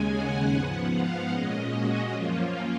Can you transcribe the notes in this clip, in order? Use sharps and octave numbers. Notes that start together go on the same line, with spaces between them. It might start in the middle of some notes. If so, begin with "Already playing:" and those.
Already playing: D#2 C#3 G#3 C#4 G#5
F#5
G#2 F3 B3 F#5
F5
A#2 G#3 C#4 D#5
F#4
F#2 F3 A#3 C#4 F4